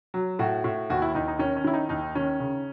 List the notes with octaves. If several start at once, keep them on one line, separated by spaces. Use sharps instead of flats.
F#3
A2 F#4
A2
D#2 F#4
E4
D#2 D#4
D#4
D#3 C#4
C#4
D#3 E4
D#4
D#2 D#4
D#3 C#4
C#3